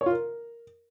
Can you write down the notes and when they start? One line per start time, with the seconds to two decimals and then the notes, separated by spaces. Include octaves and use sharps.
0.01 C#5
0.06 F4
0.11 A#4